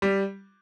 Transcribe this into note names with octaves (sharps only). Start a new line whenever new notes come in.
G3